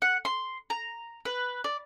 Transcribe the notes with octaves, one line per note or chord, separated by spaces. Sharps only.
F#5
C6
A#5
B4
D5